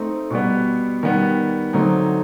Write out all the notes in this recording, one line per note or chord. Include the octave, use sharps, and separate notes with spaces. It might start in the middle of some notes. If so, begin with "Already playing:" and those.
Already playing: A3 C4 D#4
B2 G3 B3
D#3 G3 B3
D3 F#3 A3 C4 D#4